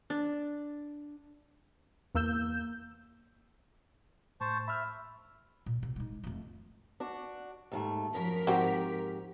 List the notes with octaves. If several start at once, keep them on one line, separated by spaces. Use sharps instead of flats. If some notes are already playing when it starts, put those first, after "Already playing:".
D4
E2 A#3 E6 G6
A2 C5 A5 C#6
E5 B5 F6
A#2
C3
G#3 D#4
F2 A3
D4 F#4
D#2 G#2 A3
F#2 F3 A#4 B6
G#2 C4 F#4 G4